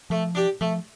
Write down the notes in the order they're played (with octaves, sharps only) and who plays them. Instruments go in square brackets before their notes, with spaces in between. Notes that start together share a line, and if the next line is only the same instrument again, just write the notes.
[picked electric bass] F3 [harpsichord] A3
[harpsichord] D4 G4
[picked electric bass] F3 [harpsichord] A3